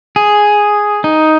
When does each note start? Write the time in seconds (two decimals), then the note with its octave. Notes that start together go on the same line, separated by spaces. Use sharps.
0.16 G#4
1.04 D#4